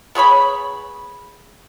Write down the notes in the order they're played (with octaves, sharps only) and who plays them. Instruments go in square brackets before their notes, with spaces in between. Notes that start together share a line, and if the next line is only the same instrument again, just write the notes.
[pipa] B3 G#4 C#5 B5